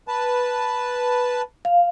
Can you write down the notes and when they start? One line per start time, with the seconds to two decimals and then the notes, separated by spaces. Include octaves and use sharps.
0.08 B4 A5
1.65 F5